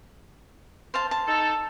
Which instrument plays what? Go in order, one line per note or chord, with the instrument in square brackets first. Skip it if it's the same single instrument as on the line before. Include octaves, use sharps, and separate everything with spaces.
[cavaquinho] C5 F5 A5
A5
[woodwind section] D#4 A4